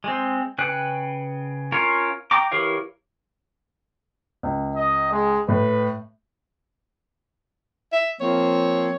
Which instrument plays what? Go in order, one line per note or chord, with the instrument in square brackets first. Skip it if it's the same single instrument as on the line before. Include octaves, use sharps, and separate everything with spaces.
[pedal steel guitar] G#3 C4
C#3 B4 G5 F#6
C#4 F4 A#4 C#5
G5 A#5 D6
E3 G4 A#4 C#5 F5
[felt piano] C#2
[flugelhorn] D#5
G#3
[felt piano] A2 [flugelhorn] B4
[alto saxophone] E5
[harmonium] F3 A#3 C4 [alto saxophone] C#5